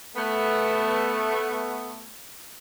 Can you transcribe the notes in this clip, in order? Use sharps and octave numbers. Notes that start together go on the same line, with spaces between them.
A3 B3